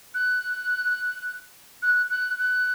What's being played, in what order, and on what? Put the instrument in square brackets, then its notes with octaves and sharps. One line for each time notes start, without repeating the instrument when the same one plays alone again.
[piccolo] F#6
F#6
F#6
F#6